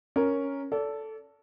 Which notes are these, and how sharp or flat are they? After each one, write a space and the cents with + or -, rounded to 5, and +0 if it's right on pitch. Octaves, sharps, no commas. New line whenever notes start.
C#4 +0 A#4 +0
A4 +0 D5 -35